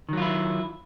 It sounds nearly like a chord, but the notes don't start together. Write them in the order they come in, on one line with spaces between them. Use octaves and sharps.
D#3 F#3 F4 E4